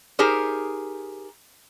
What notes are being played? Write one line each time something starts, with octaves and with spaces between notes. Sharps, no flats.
D#4 G4 G#4 A#4 C5